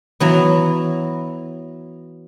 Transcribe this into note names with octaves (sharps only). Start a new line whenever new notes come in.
E3 F#3 B3